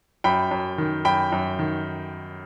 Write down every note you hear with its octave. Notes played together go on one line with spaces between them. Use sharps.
F#2 G5 B5
F#2
D#3
F#2 G5 B5
F#2
D#3